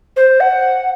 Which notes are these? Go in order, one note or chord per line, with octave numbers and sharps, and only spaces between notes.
C5
F#5